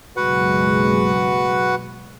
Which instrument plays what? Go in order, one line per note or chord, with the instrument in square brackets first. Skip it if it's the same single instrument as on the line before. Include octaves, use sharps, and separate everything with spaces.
[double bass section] F#1 B1 G#3 [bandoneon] F#4 B4 F#5